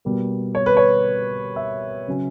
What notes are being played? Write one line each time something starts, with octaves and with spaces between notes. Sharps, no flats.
B2 G3 A#3
C#5
B4
C#5
E5
C#3 F#3 C#4